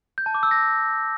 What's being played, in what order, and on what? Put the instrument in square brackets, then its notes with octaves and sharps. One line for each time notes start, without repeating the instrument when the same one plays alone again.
[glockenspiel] G6
A5
D6
E6
A#6